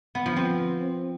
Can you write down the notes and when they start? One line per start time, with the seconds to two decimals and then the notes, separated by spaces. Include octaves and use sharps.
0.15 B3
0.26 F3
0.36 C4